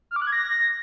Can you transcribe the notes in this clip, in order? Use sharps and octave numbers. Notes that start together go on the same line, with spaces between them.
F6
D6
F#6
G#6
A#6